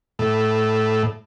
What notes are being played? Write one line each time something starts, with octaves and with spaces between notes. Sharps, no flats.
A2